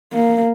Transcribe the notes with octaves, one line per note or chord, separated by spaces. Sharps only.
A#3